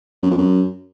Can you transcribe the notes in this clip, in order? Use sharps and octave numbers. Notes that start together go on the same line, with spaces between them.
F#2
F2
F#2